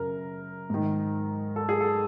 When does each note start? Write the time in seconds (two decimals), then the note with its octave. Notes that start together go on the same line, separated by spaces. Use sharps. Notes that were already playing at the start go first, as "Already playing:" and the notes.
Already playing: F#2 C#3 A#4
0.70 G#2 D#3
1.56 A4
1.69 G#4
1.81 A4